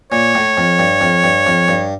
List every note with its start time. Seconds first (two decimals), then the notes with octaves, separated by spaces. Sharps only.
0.11 A#2 C#5
0.35 A2
0.57 F2
0.79 G2
1.01 F2
1.24 G2
1.47 F2
1.68 G2